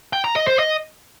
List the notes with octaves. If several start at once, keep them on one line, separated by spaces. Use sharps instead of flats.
G5
A#5
D#5
C5
D#5